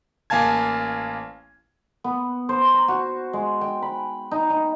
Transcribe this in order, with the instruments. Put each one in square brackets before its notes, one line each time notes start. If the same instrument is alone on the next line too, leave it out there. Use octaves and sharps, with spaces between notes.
[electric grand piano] A1 A#3 F5 G#5 A5 G#6
[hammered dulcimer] B3
C5
A#5
F#4
G#3
G5
B5
D#4
D#4